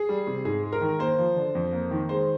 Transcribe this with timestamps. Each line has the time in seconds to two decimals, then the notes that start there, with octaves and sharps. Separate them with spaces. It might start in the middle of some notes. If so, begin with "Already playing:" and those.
Already playing: G#4
0.09 G3
0.27 C3
0.45 G#2 G#4
0.63 G#3
0.73 A#4
0.81 D#3
0.99 A#3 C5
1.19 F3
1.36 D3
1.55 F2
1.73 A#3
1.91 D#3
2.09 G#3 C5